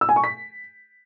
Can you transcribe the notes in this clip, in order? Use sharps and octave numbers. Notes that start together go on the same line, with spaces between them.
E6
G#5
C#6
B6